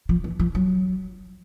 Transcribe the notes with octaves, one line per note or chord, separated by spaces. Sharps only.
F3
E3
F3
F#3